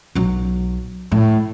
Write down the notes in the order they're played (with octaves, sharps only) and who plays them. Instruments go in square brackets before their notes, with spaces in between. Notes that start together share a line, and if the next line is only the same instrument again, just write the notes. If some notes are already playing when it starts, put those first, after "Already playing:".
[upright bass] B1 F#3
A2